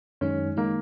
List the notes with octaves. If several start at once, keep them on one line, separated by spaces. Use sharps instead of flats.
F#2 D#3 G#3 C#4 D#4
D#3 G#3 A#3 D#4